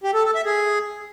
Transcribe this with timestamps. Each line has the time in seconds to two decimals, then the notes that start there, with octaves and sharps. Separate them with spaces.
0.04 G4
0.14 A4
0.25 A4
0.35 E5
0.46 G#4